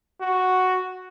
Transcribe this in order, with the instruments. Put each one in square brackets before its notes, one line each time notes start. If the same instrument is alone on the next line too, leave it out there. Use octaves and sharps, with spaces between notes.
[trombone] F#4